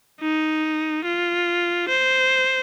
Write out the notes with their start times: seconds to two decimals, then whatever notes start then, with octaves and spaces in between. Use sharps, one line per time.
0.21 D#4
1.05 F4
1.89 C5